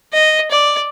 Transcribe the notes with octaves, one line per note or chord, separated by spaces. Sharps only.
D#5
D5